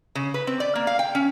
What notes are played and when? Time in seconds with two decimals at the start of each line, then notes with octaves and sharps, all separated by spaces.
0.15 C#3
0.34 B4
0.47 C4
0.60 D5
0.75 A#3
0.87 F5
0.99 G5
1.15 C#4